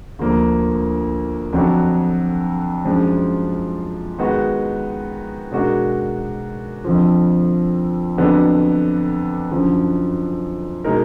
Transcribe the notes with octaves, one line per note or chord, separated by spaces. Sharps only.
D2 D3 F3 A#3 D4
F2 D3 F#3 D4 F#4
F#2 F3 G#3 D4 F4
D#3 G#3 B3 D#4 F#4
B2 G#3 D4 F#4 A#4
F2 D3 F3
F2 D3 F#3 B3 D4
F#2 D3 F3
B2 G#3 D#4 A#4